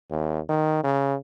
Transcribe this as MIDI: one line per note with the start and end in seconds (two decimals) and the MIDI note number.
0.10 0.40 39
0.49 0.83 51
0.84 1.15 49